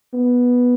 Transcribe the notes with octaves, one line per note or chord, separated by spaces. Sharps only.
B3